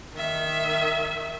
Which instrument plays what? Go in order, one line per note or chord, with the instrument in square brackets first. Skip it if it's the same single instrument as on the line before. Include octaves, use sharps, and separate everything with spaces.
[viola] D#3 E5